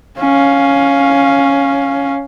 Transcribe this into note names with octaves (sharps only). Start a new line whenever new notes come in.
C#4 F5